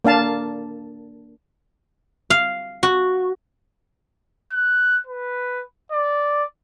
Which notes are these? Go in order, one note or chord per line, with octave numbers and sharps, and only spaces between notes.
A#3 D4 F5 A5
F5
F#4
F#6
B4
D5